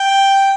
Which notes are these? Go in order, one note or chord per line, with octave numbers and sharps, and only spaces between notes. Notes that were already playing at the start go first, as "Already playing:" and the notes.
Already playing: G5